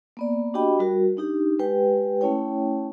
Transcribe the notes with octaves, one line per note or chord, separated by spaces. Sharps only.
A#3 B3 D5
D4 F#4 G4 D#5 G5 B5
G3 F#4 A#4
D4 D#4 G4
G#3 G4 B4 G5
A3 C#4 E4 C#5 G5